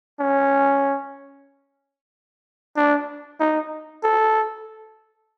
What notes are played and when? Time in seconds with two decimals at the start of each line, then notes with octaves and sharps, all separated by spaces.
0.20 C#4
2.76 D4
3.40 D#4
4.03 A4